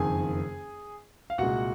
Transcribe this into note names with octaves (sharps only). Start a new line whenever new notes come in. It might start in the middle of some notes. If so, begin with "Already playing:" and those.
Already playing: F#1 F2 D#3 G#4 G#5
F5
C2 A#2 G#3 F#4 F#5